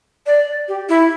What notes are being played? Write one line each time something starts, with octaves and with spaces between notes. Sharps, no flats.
D5
G4
E4